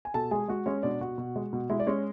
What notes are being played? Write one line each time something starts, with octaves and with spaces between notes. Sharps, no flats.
G#5
B2 A4 A5
G#3 G#4 G#5
G#3 F#4 F#5
G#3 C#4 C#5
B2 D4 D5
B2 F#4 F#5
B2
G#3
B2
G#3 E4 E5
D5
G#3 C#4 C#5